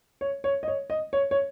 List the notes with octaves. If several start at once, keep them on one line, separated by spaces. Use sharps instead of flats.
C#5
C#5
D#5
C#5
D#5
C#5
C#5